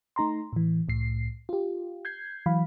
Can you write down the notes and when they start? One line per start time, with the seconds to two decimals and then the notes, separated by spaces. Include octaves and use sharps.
0.16 A3 D#4 A#5 C6
0.53 A2 E3
0.88 C2 A2 C7
1.49 F4 G4
2.05 G6 G#6 C7
2.46 E3 F#3 F5 B5